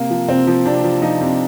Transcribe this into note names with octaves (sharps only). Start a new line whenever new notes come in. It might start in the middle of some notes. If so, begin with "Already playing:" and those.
Already playing: C3 A#3
F3
C3 C4
F3
C3 D4
F3
F3 D#4
C3